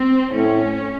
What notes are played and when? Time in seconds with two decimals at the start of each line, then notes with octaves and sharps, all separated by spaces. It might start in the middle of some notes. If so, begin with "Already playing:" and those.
Already playing: C4
0.33 A2 C#4